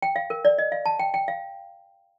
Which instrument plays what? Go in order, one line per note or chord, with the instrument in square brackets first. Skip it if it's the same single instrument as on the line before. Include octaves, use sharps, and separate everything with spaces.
[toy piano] G5
F5
A#4
D5
D#5
F5
A5
G5
G5
F5